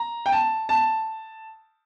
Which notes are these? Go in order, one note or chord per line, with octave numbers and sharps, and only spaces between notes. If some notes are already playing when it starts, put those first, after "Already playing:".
Already playing: A#5
G5
A5
A5